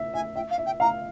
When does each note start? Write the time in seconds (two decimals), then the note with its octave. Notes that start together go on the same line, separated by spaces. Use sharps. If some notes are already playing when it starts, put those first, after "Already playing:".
Already playing: E5
0.14 E5 G#5
0.35 E5 G5
0.50 F5
0.58 E5
0.66 G5
0.80 F5 A#5